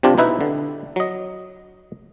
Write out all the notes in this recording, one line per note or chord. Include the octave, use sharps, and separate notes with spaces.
C3 C4 D4 F4 G4
B2 D#4 E4 B4 E5
D3
F#3 D#5